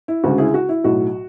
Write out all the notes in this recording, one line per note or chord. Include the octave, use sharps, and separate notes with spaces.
E4
D2 C#3 G#3 F#4
E4 G#4
F#4
E4
B1 A2 F#3 F#4